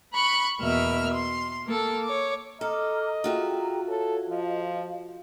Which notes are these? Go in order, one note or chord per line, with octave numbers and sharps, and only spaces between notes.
B5 C#6 F#6
E2 B2 A#3 E5 F6
C6
A#3 A4
C#5 D6
A4 D#5 A#5 D6 F6
F4 F#4 G#4 E5 G5 A#5
A4 C#5 A5
F3 D#5 F5